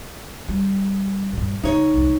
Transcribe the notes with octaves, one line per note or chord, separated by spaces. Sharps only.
G3
G2 A#2
C#3 D#4 C#5
C2 F2